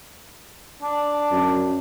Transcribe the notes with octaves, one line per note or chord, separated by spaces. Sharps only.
D4
F#2